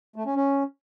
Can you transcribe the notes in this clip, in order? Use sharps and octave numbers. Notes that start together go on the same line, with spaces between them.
A3
C#4
C#4